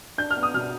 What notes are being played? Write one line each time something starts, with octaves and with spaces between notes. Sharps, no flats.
D4 G6
F6
B3
D#6
B2 F6